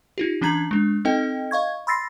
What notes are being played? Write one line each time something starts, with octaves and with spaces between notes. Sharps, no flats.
D#4 F4 G4
E3 C#4 D4 A#5 G#6 F#7
G#3 D4
C4 D#4 A4 D#5 G5
D#5 F5 C#6 G#6
B5 C6 E6 A6 A#6 C7